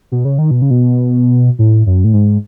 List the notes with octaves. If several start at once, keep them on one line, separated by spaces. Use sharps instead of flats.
B2
C#3
D#3
B2
C#3
B2
A2
F#2
A2
G#2